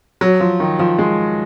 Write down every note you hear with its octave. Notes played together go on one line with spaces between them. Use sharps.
F#3
F3
D#3
F3
G#3